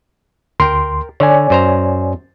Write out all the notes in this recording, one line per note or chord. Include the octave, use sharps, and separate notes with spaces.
D2 A#4 G5 C6
D3 C#5 D5 G#5
F#2 C5 A#5